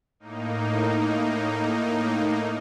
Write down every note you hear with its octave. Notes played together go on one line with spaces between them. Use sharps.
A2 A#3 D#4